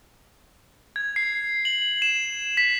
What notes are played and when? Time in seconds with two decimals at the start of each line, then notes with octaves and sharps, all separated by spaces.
0.96 G#6
1.16 C7
1.65 F#7
2.02 E7
2.57 B6